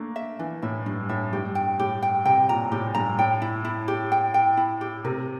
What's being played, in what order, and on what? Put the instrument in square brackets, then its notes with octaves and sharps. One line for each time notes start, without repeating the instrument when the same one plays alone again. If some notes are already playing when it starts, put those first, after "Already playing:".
Already playing: [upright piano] A3 A#3 [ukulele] D4
[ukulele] E5
[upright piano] E3 [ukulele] D4
[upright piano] A2 [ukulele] E5
[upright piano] G2 [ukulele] D4
[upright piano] A2 [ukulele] E5
[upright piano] G2 [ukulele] G4
[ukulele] G5
[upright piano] A2 [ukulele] G4
[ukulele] G5
[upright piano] C3 [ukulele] G5
[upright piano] A#2 [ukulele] A#5
[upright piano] A2 [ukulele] G4
[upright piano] G2 [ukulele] A#5
[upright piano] A2 [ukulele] G5
[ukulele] E4
E4
G4
G5
G5
E4
G4
[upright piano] C3 [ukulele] A#4